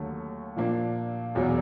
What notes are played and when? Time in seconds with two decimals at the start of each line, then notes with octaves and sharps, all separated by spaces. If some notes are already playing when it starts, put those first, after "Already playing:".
Already playing: D#2 D3 F#3 A3
0.56 A#2 F3 A#3 D4
1.35 E1 E2 B2 F#3